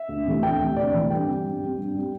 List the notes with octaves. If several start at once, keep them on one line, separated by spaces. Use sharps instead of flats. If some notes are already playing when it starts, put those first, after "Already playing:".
Already playing: E5
D2
C3 E3 A3
D2 G5
C3 E3 A3
D2 D5
C3 E3 A3
G2 G5
G3 C4
G2
G3 C4
G2
G3 C4